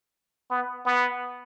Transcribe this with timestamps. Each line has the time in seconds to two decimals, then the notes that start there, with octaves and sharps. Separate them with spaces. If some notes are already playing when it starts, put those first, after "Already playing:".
0.50 B3
0.85 B3